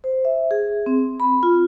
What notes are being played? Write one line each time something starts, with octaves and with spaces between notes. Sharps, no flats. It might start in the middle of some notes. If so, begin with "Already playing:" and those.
C5
E5
G#4
C4
B5
F4